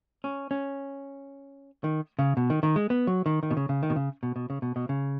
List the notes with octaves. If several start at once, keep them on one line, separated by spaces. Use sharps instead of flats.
C#4
C#4
D#3
C#3
B2
D#3
D#3
G#3
B3
F#3
D#3
D#3
B2
C#3
C#3
D#3
B2
C#3
B2
B2
C#3
B2
B2
C#3